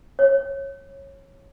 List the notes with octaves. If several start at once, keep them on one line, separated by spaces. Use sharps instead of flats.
C#5